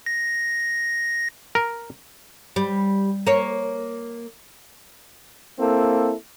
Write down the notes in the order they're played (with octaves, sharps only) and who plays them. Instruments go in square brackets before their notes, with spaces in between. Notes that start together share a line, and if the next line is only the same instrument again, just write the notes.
[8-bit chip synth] A#6
[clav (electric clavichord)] A#4
[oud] G3
A#3 C#5
[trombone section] A#3 C4 E4 A4